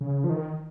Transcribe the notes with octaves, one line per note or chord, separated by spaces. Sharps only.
C#3
F3
D#3